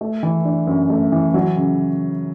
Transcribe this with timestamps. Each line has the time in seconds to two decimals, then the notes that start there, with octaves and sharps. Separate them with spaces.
0.01 A3
0.23 E3
0.45 D4
0.67 F#2
0.90 A3
1.12 E3
1.34 F#3
1.57 C#3